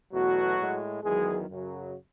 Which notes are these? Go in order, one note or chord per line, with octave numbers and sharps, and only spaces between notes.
E2 B2 F#3 A3 F#4
A2 G#3
E2 D#3 F#3 G#3 G#4
F#2 C#3 F#3